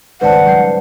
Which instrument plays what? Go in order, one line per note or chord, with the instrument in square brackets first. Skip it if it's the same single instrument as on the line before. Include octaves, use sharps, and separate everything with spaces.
[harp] G#1 C#2 C5 [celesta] B4 D5 A5 [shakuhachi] F#5
[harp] F#3 G6 C7